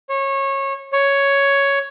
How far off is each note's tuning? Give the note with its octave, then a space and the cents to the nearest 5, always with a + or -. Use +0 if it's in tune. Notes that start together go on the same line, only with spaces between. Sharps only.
C#5 -25
C#5 +5